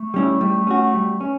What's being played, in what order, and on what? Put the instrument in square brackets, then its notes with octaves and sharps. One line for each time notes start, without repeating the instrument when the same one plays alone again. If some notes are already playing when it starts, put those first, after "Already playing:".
Already playing: [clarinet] A3
[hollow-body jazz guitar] G3 C#4 E4
G3
C#4 F#4
G3
C#4